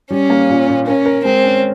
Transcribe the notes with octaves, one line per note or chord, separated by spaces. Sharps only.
G3 C#4
A#3
A#2
A#2
C#4 A#4
A#4
G#3 C4
C#4